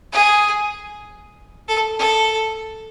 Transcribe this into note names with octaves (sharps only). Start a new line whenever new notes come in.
G#4
A4
A4